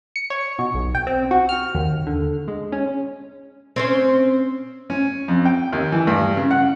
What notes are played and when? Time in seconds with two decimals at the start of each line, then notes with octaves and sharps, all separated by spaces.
0.16 C#7
0.30 C#5
0.59 B2
0.74 B1
0.95 G5
1.07 C4
1.31 F#4
1.49 F6
1.75 D#2
2.07 D3
2.48 G#3
2.72 C#4
3.76 C4 C#4 C5
4.90 C#4
5.28 F2
5.45 G5
5.73 D#2
5.92 E3
6.07 G2
6.37 C#3
6.51 F#5